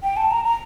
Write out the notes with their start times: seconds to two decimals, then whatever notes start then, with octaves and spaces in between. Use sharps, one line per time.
0.03 G5
0.17 A5
0.31 A#5
0.45 A#5